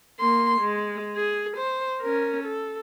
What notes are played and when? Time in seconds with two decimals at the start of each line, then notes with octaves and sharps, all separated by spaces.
0.20 A#3 C6
0.61 G#3
1.16 G#4
1.57 C5
2.01 C#4 A#4
2.43 A4